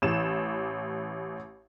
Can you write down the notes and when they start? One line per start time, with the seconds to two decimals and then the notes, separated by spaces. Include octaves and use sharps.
0.02 A1 E3 E7